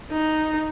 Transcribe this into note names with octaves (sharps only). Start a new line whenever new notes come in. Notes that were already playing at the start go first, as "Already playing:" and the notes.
D#4